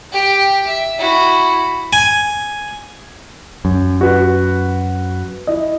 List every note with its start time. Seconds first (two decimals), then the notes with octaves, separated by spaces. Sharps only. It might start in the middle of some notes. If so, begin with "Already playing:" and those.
0.12 G4 G5
0.67 E5
0.99 E4 F#4
1.93 G#5
3.65 F#2
4.01 F#4 B4
5.47 E4 D#5